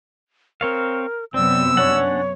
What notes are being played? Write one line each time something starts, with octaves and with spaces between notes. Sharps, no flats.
C4 A#4 C#5 F5
F#2 C3 B3 C4 D5 E6
C#4 D4 C#5 F#5